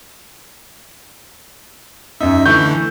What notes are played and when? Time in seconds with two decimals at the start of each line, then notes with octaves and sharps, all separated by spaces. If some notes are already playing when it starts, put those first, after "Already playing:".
2.21 F#2 D#4 E5
2.46 D3 E3 A3 C#6 G6